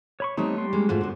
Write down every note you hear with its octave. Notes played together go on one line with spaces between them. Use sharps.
C#5 B5 C#6
G3 A3 B3 C4 D#4 C#5
G3 C6
G#3 A#3 C#4
G#2 D3 A3 F4 F#4 C5
F#2 B3